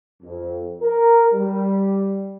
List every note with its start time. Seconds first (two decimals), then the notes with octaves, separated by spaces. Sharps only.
0.23 F2
0.81 A#4
1.33 G3